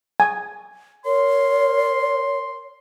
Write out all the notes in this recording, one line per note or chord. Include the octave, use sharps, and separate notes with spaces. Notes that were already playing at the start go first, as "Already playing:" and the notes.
G#5
A#4 C#5 C6